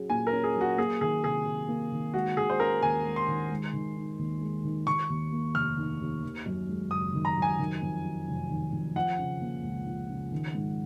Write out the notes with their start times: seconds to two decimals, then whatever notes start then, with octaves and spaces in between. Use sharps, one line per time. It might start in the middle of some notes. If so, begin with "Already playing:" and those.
Already playing: F#3 C#4 G#4
0.10 A#2 G#5
0.27 A#4
0.32 C#4
0.44 G#4
0.56 F#3
0.61 F#4
0.78 A#3 G#4
1.01 D#3 G#4
1.23 C3 G#4
1.46 C3
1.68 A#3
1.92 D#3
2.14 G#3 F#4
2.37 D#3 G#4
2.50 C5
2.59 C#4 A#4
2.82 D#2 G#5
3.05 G#3
3.16 C6
3.28 D#3
3.50 G#3
3.73 D#3
3.96 D#4
4.19 D#2
4.41 G#3
4.64 D#3
4.87 D#3 C#6
5.09 D#2
5.32 A#3
5.55 F1 F6
5.78 D#3
6.00 D#2
6.23 D#3
6.46 F#2
6.69 G#3
6.91 F#1 D#6
7.14 D#3
7.25 A#5
7.37 F#2
7.42 G#5
7.59 D#3
7.82 F2
8.04 F#3
8.28 F1
8.50 D#3
8.73 F2
8.96 F3 F#5
9.18 C#3
9.41 A#3
9.63 C#2
9.87 F3
10.10 C#3
10.32 D#3
10.54 G#2